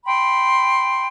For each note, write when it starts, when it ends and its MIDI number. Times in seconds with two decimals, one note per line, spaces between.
0.04 1.07 79
0.04 1.07 83
0.04 1.07 84